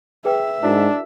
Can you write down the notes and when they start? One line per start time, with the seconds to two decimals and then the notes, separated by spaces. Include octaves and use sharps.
0.25 G#4 B4 E5 G5
0.63 G#2 D4 E4 F#4 A#4